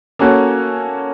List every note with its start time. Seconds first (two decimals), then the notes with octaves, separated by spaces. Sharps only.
0.19 A#3 C#4 F#4 A4 C#5